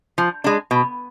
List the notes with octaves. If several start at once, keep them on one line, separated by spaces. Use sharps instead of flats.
F3
G#3 D4
B2